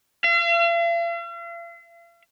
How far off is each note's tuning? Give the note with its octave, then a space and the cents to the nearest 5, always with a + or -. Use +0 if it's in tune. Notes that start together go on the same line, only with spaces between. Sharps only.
F5 -45